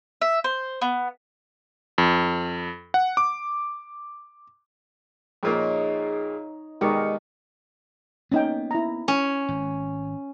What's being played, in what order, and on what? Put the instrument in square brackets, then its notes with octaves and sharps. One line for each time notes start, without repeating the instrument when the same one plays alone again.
[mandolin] E5
C5
B3
[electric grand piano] F2
F#5
D6
[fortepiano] F2 A#2 A#3 [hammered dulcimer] D#4 C#5 [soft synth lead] G#4
[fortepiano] B2 D#3 [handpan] G#3 G4 A#4 [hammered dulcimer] D5 D#5 [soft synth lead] C#7
[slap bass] A#3 B3 [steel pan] C#4 D#4 G5
[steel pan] E4 A#5
[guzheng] C#4
[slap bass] G#1